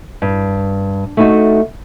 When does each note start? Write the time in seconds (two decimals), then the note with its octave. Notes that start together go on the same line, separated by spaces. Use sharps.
0.22 G2
1.17 A3 D#4 F#4